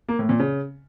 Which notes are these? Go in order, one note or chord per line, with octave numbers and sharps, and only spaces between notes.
A#3
A2
A#2
C#3